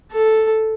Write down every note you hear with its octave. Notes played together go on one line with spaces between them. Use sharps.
A4